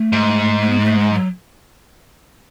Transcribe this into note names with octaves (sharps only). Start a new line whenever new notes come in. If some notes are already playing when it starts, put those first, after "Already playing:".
Already playing: A3
G#2
A3
B3
G#3
A3
G#3
F#3